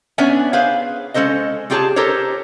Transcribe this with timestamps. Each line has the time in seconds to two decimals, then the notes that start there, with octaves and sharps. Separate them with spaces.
0.18 B3 C#4 D4 C#5 E5 G#5
0.53 G#4 B4 C5 F5
1.14 G#3 C#4 A4 C5 D#5
1.70 G3 F4 G4 G#4 C#5 A5
1.96 G4 A4 A#4 C5 C#5